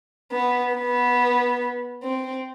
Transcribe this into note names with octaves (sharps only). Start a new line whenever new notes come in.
B3
B3
C4